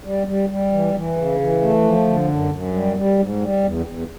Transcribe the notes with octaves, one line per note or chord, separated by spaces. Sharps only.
G3
G3
G3
E3
E3
C#3
E3
A3
F3
D3
F#2
F#2
G3
G3
G#2
G3
E2
E2